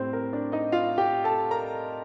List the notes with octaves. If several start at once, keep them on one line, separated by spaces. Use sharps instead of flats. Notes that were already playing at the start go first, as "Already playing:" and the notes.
Already playing: A2 G3 C4 C5
A#4
D4 D5
D#4 D#5
F4 F5
G4 G5
A4 A5
A#4 A#5